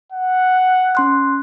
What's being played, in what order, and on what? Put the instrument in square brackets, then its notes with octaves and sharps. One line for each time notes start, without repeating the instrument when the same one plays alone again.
[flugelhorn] F#5
[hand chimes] C#4 C6 F#6